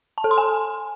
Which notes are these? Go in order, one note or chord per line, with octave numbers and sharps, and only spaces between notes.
A5
A4
C6
G#5